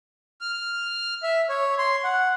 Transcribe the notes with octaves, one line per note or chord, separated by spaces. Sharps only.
F6
E5
C#5
C6
F#5